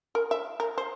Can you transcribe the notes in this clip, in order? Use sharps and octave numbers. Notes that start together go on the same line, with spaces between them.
A#4
E5
A#4
C5